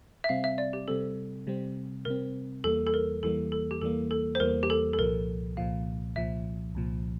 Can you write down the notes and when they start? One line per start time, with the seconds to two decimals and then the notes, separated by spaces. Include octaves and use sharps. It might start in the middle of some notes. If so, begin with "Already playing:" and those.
0.24 E5
0.29 C3 G3 C4 F5
0.44 E5
0.58 D5
0.73 G4
0.88 C3 G3 C4 A4
1.47 C3 G3 C4
2.05 C3 G3 C4 A#4
2.64 E2 E3 G3 A#3 A4
2.87 A4
2.94 A#4
3.23 E2 E3 G3 A#3 A4
3.52 A4
3.71 G4
3.82 E2 E3 G3 A#3 A4
4.11 A4
4.35 C5
4.40 E2 E3 G3 A#3 A#4
4.63 G4
4.70 A4
4.93 A4
4.99 C2 A#2 F3 A#4
5.57 C2 A#2 F3 F5
6.16 C2 A#2 F3 E5
6.75 C2 A#2 F3